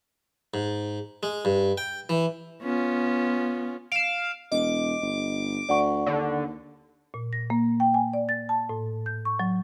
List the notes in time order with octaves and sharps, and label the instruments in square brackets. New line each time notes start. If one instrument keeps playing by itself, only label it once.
[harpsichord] G#2
G#3
G2
G5
E3
[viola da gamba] B3 C#4 F4
[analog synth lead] F5 [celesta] D7 E7
[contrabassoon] E1 [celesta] D#5 [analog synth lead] D6
[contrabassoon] G1
[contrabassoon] D2 [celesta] D5 F#5 C#6
[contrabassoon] D#2 [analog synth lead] D3
[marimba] A#2
A#6
A#3
G5
G#5
D5
A6
A5
A2
G6
C#6
F#3